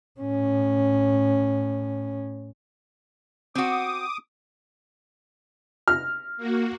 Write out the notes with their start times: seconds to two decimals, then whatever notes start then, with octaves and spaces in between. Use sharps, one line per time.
0.21 A2 C#4
3.55 C4 F#4 D6 D#6
5.88 F6
6.37 A#3 F#4